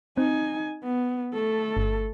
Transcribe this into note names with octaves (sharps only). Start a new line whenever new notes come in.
C4 D#4 G#5
B3
A3 A4
G1